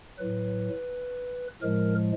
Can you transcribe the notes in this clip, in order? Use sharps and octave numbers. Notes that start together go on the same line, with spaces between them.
A2 F#3 B4
A2 F3 G#3 A#4